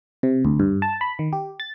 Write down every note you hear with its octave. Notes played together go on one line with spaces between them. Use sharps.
C3
D2
G2
A5
B5
D#3
G4
A6